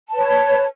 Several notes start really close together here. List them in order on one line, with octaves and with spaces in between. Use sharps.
A5 B4 C#5